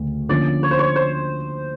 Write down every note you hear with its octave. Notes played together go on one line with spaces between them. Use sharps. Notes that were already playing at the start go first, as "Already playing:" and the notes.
Already playing: D2 C#3
D3 F3 A#3 C#4 D5
C#5
C5
C#5
C5